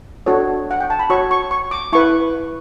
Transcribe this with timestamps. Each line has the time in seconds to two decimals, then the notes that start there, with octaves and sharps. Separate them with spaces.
0.26 D4 F#4 A4 C#5
0.71 F#5
0.80 G5
0.90 A5
0.99 B5
1.10 F#4 C#5 C#6
1.31 C#6
1.51 C#6
1.71 D6
1.93 E4 B4 C#6